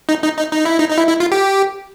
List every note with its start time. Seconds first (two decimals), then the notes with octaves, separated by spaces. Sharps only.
0.09 D#4
0.24 D#4
0.39 D#4
0.53 D#4
0.65 E4
0.78 D#4
0.90 D#4
0.98 E4
1.09 E4
1.20 F4
1.32 G4